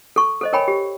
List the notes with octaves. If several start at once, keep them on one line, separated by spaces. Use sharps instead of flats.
A4 C#6
A4 C5 D#5
A#4 C#5 G5 G#5 B5
G4